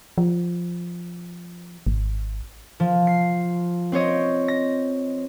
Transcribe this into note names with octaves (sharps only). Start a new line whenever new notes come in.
F3
G#1
F3
C7
C4 C5 C#5 D#5
A#6